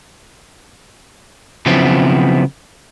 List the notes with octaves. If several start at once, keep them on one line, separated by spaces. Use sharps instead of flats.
C#3 F3 F#3 B3 C4 E4